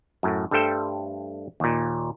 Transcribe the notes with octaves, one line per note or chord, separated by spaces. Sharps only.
F#2 A2
G2 G3 A3 A4 C5 G5
D#2 A#2